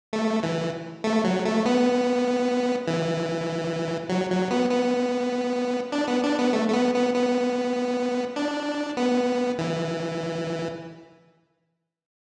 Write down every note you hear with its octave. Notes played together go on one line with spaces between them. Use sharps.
A3
E3
A3
F#3
A3
B3
E3
F#3
F#3
B3
B3
D4
B3
D4
B3
A3
A3
B3
B3
B3
D4
B3
E3